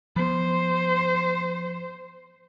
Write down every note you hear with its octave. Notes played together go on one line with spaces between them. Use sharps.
F3 B3 C5